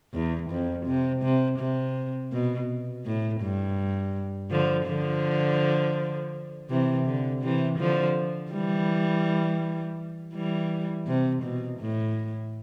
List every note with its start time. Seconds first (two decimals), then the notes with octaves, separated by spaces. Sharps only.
0.13 E2
0.50 F2
0.86 C3
1.22 C3
1.59 C3
2.32 B2
3.05 A2
3.41 G2
4.51 D3 F3
4.87 D3 F3
6.70 C3 E3
7.06 D3
7.42 C3 E3
7.79 D3 F3
8.52 E3 G3
10.34 E3 G3
11.07 C3
11.43 B2
11.80 A2